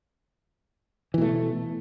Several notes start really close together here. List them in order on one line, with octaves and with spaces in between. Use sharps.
E3 B2 A3